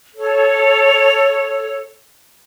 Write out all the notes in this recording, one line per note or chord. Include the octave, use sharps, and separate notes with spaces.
A4 C#5